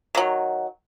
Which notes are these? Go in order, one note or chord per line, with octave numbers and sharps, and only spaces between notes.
D#3 F#3